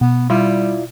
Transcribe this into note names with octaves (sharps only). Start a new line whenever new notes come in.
B2 B3
G3 E4 F4 D5